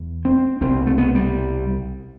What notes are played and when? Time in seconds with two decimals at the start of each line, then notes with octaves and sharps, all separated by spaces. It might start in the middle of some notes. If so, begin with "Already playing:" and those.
Already playing: E2
0.25 C4
0.61 C2 B2 C4
0.86 A3
0.98 B3
1.15 G3